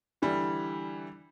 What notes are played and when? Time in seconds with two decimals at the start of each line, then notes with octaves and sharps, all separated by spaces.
0.22 D3 E3 G3